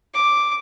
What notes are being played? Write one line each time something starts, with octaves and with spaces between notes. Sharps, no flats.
D6